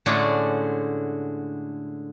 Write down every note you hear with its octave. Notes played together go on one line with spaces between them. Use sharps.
A2 D3 G#3 C#4 D4 F#4